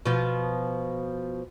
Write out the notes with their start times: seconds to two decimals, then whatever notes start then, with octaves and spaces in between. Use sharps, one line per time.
0.06 B2 F3